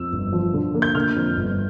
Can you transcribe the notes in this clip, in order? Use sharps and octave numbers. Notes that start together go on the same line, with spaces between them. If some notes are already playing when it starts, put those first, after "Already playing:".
Already playing: F2 E6
G1
F3
D3
A#3
G6
D3 F6
F2
G1